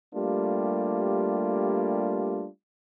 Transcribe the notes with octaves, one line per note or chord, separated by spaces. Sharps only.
G3 A3 A#3 D4 F4 G4